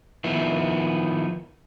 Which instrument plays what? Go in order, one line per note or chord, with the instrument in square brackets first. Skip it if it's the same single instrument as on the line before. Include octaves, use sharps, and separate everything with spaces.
[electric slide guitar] D#3 F3 B3 E4